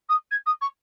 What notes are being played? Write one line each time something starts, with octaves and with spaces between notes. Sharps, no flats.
D#6
G#6
D#6
C#6